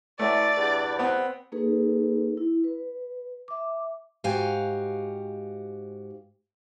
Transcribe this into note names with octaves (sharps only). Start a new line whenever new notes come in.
E3 F#3 A3 D5
E2 G2
B3 C4
A#3 D#4 G#4 A4 B4
E4
B4
E5 D6
G#2 F#4 G4 F5 G#5